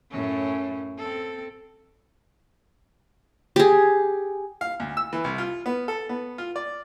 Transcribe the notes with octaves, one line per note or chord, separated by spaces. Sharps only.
F#2 A2 C#4
C4 A4
G4 G#4
F5
D2
E6
E3
C2
F4
B3
A4
B3
F4
D5